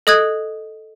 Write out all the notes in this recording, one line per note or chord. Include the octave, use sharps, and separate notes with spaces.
A4 D#5 D#6 F#6 G#6